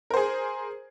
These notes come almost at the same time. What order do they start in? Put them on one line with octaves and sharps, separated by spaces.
A#4 C5 G#4